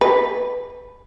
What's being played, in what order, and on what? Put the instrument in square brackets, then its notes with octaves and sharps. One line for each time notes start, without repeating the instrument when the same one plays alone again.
[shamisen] B4